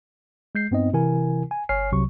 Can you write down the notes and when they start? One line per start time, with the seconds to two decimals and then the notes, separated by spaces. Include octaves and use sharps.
0.55 G#3 G6 C7
0.71 G2 B3 C4 D#4 D#5
0.93 C3 E3 E4 A#4 G#5
1.51 G#5
1.69 G1 C#5 G#5 F6 C7
1.92 C2 C3 F#3 C#6